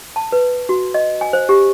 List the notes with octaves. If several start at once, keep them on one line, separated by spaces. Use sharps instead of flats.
A5
B4
F#4
D#5
G#5
C5
G4